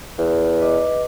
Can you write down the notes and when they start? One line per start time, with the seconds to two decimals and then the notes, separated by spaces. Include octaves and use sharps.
0.18 E2
0.60 B4 D#5 D6